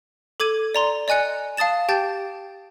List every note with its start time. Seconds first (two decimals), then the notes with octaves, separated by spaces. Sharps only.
0.40 A4 D6 G#6 D#7
0.74 D5 A#5 C6
1.08 D5 D#5 G#5 F#6 C#7
1.57 F5 A5 D#6 A6 E7
1.89 G4 G5 A5 G6 A6